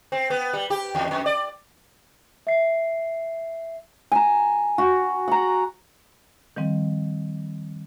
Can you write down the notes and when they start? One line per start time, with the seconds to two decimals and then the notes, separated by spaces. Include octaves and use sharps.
0.12 C4
0.30 B3
0.53 G3
0.70 G4
0.95 E2
1.11 F2
1.26 D5
2.47 E5 C7
4.12 G#5 A#5
4.78 F#4
5.28 F#5 A#5
6.56 D#3 F3 G3 C4